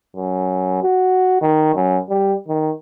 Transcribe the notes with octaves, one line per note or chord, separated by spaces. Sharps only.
F#2
F#4
D#3
F#2
G3
D#3